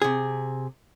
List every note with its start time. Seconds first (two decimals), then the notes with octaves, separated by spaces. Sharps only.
0.02 C3 G#4